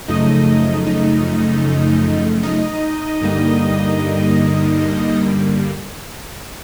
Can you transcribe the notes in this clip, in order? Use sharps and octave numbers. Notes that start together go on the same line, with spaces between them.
F#2 C#3 F3 A3 D#4 D#5
D#4 D#5
D#4 D#5
G2 D3 G3 A#3